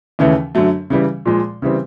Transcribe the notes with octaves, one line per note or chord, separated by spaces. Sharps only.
D#2 C#3 E3 A3 C#4
F#2 D3 F#3 A3
C#3 E3 G3
A#2 F3 G#3
C#3 E3 G3 C4